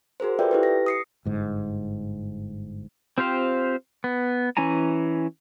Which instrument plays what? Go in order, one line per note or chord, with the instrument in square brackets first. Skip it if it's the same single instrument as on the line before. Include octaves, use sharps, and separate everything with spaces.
[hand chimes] F#4 G#4 A#4 C5
F4 A4 B4 D5 E5 G5
E4 G4 B4
A#6
D#6 C7 C#7
[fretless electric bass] G1 G#2
[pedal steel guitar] C4 F4 G4 C5 F5
B3
E3 C#4 E4 G#5 A#5